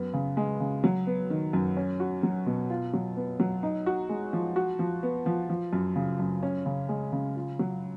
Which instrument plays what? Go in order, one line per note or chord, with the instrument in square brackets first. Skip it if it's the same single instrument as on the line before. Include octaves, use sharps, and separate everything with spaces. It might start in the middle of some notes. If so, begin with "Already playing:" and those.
Already playing: [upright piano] F#2 B3
C#3
G#3
C#3
F#3
B3
D#3
F#2
C#4
F#4
F#3
B2
F4
F#3
B3
F#3
D#4
F#4
G#3
F3
F#4
F3
B3
F3
F3
F#2
C#3
F#2
C#4
C#3
G#3
C#3
F4
F#3